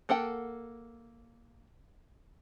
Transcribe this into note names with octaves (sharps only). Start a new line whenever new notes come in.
A#3 A4 F#5 G5